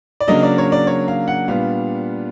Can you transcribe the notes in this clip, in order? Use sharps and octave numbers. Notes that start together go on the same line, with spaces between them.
D5
C#3 F#3 A#3 D4 D#5
D5
C#5
D5
C#5
F5
F#5
A#2 G3 B3 D4 F5